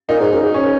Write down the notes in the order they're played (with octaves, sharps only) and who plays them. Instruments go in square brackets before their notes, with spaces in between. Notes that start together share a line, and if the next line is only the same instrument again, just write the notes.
[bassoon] A#2 [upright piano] D#4
[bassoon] G#2
F#2
G#2
[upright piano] C#4